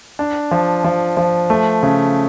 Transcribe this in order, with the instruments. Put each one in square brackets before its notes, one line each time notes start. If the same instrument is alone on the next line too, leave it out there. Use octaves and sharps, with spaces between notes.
[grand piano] D4
F3
F3
F3
A3
C#3